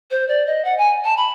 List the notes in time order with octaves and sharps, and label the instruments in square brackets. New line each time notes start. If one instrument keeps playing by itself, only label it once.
[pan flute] C5
D5
D#5
F#5
G#5
A5
B5